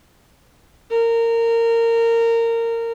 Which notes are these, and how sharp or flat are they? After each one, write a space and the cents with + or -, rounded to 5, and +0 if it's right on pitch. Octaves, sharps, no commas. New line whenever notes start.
A#4 -20